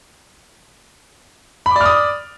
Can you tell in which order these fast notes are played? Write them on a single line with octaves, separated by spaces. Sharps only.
B5 D6 D5 F6 D#6